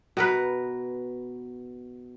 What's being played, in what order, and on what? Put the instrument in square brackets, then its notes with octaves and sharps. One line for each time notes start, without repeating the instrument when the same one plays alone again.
[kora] B2 A#4 B4